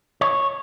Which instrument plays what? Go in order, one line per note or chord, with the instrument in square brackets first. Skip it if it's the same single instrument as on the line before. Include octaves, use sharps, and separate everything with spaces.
[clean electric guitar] C#5